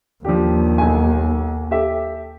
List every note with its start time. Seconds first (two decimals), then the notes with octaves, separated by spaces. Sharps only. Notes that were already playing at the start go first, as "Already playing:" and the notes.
0.25 D#2 F3 D4 G4
0.78 B1 G#5
1.71 G4 A4 E5